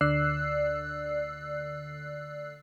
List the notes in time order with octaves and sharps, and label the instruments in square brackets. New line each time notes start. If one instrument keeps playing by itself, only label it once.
[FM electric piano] D2 D3 D5 E6 F#6 C7